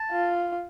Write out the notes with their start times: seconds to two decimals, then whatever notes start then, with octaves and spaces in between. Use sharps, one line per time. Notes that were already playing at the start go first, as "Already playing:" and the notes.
Already playing: A5
0.12 F4